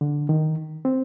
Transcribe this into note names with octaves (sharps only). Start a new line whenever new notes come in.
D3
D#3
C4